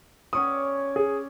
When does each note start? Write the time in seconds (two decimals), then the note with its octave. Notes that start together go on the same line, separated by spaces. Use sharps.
0.33 C#4 C#5 D5 D#6
0.96 G#4